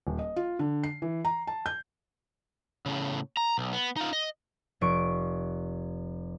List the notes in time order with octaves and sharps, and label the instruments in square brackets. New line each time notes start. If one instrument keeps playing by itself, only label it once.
[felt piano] D#1
D#5
F4
D3
C7
E3
A#5
A5
G6
[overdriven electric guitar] A2 C#3
A#5
B1
B3
D#4 F4
D#5
[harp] F1 C#6 D7